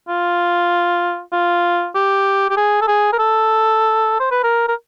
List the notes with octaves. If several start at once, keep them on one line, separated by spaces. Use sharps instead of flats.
F4
F4
G4
G4
G#4
A4
G#4
A#4
A4
C5
B4
A#4
A#4